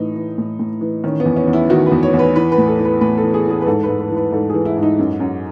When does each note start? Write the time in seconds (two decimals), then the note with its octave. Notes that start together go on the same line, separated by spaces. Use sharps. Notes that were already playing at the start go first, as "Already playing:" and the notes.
Already playing: A2 E3 D#4
0.15 E3
0.38 A2
0.59 A2
0.81 E3
1.04 D#3 C#4
1.20 B3
1.26 E2
1.36 C#4
1.47 E2
1.53 E4
1.70 D#3 F#4
1.86 B4
1.92 E2
2.03 C#5
2.13 E2
2.19 B4
2.36 E3 B4
2.52 B4
2.58 A2
2.68 A4
2.79 E3
2.85 B4
3.01 A2 B4
3.18 A4
3.23 E3
3.34 G#4
3.45 E3
3.50 G#4
3.61 B4
3.66 G#2 A4
3.83 B4
3.89 G#2
4.00 B4
4.10 E3
4.16 B4
4.33 G#2 A4
4.50 E3 G#4
4.65 E4
4.77 G#2
4.83 D#4
4.99 F#2
5.20 F#2